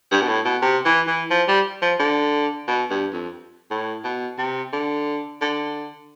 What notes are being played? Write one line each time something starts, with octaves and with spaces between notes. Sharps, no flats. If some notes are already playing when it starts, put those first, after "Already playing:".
G2
B2
A2
B2
C3
E3
E3
F3
G3
F3
D3
B2
G2
F2
A2
B2
C3
D3
D3